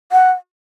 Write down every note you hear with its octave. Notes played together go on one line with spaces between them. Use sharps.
F#5